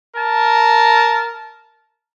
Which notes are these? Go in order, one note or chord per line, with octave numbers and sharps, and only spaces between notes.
A#4 A5